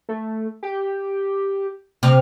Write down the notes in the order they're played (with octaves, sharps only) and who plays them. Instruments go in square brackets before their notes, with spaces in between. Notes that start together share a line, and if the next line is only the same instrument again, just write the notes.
[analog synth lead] A3
G4
[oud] C3 [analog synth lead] F6